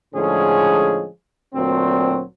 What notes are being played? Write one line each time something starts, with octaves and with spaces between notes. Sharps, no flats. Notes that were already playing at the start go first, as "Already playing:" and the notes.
A2 D3 F3 G#3 C#4 G#4
D2 A#2 F#3 C4